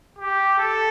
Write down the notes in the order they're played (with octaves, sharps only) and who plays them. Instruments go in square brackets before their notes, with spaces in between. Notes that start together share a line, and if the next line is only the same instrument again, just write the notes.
[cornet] G4
A4